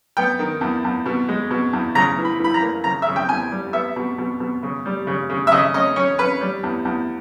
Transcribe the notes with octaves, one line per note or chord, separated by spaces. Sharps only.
B3 G5
D#3
E2
E2
B2
G#3
B2
E2
C#3 A#5
E3
B5
E3 B5
A#5
A#3
C#3 A#5
C#3 E5
G5
E2 G#5
G3
B3 E5
B2
B2
B2
C#3
G3
C#3
C#3
E5
C#3 D#5
C#4 D#5
C#4 C#5
C#4 B4
G3
E2
E2